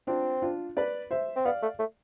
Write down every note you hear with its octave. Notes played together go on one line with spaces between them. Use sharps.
C4 D4 F4
D4 F4
B4 D5
C5 E5
C4
B3 D5 F5
A3
A3